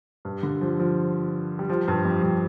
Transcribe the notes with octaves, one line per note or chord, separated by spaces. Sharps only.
G2
D3
F3
F3
G3
F3
G2
F2
G2